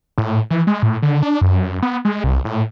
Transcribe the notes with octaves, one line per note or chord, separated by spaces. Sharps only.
A2
E3
G#3
A2
D3
D4
F#2
B3
G#3
C2
A2